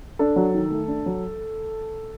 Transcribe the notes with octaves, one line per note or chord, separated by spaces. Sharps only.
D4 A4
F#3
D#3
A3
D4
F#3